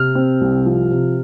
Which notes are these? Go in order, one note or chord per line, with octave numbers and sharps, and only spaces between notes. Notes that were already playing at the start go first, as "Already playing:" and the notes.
Already playing: C3 F6
C4
C2
F3
C3